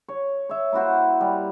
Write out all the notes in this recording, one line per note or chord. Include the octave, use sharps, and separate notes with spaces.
C#5
C#5 E5
A#3 E4 F#4 C5
G3